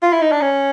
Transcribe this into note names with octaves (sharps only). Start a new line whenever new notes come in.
F4
E4
D#4
D4
C#4